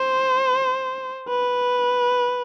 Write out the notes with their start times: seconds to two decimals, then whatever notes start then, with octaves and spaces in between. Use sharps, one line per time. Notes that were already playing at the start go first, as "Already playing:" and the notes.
Already playing: C5
1.29 B4